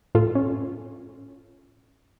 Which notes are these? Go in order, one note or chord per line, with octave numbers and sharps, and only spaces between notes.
A2 F4 A4
C#4